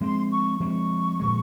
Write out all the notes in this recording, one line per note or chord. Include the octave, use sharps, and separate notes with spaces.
F3 G#3 C4 C6
C#6
F3 G#3 C4 C#6
A#2 F3 G#3